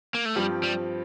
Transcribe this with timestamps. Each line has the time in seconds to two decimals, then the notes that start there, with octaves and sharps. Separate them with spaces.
0.14 A#3
0.25 A3
0.36 G2 F3 G3 C4 G4
0.63 G3